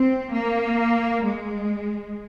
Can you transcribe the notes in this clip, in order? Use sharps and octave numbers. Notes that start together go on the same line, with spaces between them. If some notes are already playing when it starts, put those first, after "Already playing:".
Already playing: C4
A#3
G#3